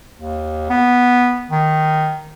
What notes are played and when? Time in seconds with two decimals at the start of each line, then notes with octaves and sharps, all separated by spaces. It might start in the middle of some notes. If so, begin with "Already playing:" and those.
0.17 D#2
0.70 B3
1.51 D#3